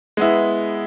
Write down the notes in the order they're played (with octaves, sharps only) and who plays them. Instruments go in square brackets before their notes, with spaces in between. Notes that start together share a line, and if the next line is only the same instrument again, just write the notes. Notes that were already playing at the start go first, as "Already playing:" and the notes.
[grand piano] G#3 B3 E4